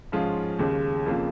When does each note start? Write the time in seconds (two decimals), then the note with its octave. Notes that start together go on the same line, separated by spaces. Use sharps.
0.12 G#2 F3 C#4 F4 G#4
0.59 D#2 C#3 G#3
1.06 F2 C#3 A#3 F4